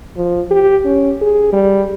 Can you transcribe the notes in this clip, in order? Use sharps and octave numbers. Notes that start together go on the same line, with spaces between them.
F3
G4
C#4
G#4
G3